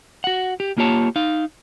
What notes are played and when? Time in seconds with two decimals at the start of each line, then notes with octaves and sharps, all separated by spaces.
0.24 F#4 F#5
0.60 G4
0.78 A#3 F4 G4 C#5 A5
1.16 D#4 F5